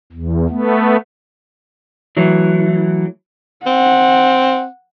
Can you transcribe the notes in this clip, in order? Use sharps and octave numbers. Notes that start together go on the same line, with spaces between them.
E2
A3 B3
E3 F#3 A3
C4 F#5